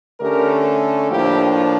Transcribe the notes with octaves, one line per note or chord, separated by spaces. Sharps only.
D3 A3 C#4 G4 A#4
A2 F3 A#3 D4 E4 G4